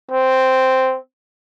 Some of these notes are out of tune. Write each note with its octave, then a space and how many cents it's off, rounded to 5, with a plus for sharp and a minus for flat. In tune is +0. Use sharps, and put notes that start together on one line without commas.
C4 -5